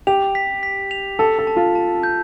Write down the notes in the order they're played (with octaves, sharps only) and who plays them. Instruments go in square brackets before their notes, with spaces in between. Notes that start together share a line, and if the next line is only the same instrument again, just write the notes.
[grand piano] G4 [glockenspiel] F7
[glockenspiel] B6
B6
F7
[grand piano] A4 [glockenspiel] A5
[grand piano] A4
[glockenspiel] A5
[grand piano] F4
[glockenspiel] A5
G6